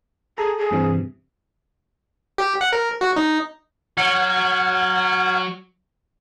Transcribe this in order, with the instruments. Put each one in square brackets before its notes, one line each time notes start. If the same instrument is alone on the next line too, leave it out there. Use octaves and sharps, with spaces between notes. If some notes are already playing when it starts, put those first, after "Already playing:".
[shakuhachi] G#4 [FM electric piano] A4 A#5
[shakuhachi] G#4
[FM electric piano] G2 C3 E3
[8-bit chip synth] G4
F#5
A#4
F#4
D#4
[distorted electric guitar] F#3 [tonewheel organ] F#5 F6 G#6